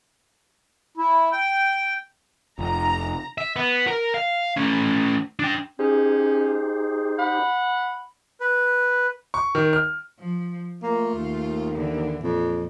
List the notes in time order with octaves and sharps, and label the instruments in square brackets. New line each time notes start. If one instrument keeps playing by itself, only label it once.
[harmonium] E4
G5
[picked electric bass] F1 [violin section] A#5
[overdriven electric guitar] E5
B3
A#4
F5
A3 C#4
D4 G5
[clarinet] C#4 [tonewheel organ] D#4 G4 C5 [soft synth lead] G#4
[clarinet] F#5 [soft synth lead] B5
[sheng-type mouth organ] B4
[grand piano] C#6
D#3
F6
[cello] F3
[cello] A3 F4 [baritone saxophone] A#3
[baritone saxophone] D#2
[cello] D3 E3
[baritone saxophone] F2 [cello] A#2